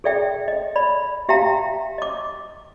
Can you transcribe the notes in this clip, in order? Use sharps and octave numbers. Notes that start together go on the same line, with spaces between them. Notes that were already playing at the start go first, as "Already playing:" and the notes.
G#4 A4 D5 E5 G5
D#5
D5 B5
G4 E5 F5 G5 A#5
D#5 D6